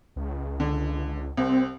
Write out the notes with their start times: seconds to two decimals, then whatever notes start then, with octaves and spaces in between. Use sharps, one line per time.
0.16 C#2
0.60 D3
1.37 C2 C4